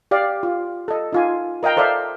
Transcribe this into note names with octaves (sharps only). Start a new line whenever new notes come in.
G4 D5 F5
F4
A4 D#5
D#4 F4 G#5
A#4 D#5 F5 G5 A#5
A4 C5 D5 E5 F5